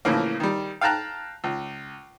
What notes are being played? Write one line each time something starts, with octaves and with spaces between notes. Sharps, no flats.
A2 C#3 E3 F3 A#3
D#3 G3
F5 G5 A5 A#5 F#6
C#2